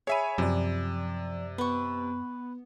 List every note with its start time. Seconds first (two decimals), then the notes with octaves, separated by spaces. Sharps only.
0.07 G#4 C#5 E5 G#5 B5 D#7
0.38 F#2 C3 F3 D5
1.58 B3 B4 C#6